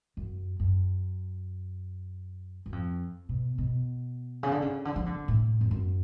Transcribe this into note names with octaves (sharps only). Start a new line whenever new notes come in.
F#2
F#2
F#2
F2
B2
B2
C#3
D3
C#3
D3
F3
D3
A2
F2
F#2